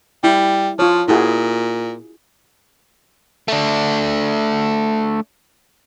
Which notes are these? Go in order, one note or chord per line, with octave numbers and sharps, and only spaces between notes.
G3 E4
F3 F4 C#5
A#2 E4 F#4 G#4
A3 D4